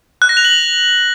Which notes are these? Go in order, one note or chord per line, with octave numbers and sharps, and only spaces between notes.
F#6
A#6
F7
F#7